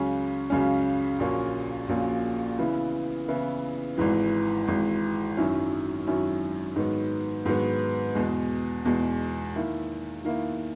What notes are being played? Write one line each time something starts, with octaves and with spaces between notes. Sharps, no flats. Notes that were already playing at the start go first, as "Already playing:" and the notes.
Already playing: C#2 C#3 F#3 C#4
C#2 C#3 F#3 C#4
A#1 A#2 A#3 C#4 F#4
A#1 A#2 A#3 C#4 F#4
C#3 E3 B3 E4
C#3 E3 B3 E4
G#1 G#2 E3
G#1 G#2 E3
F#2 D#3 F#3 C#4 E4
F#2 D#3 F#3 C#4 E4
G#2 D#3 F#3 B3 D#4
G#2 D#3 F#3 B3 D#4
E2 B2 G#3
E2 B2 G#3
D#3 A#3 E4
D#3 A#3 E4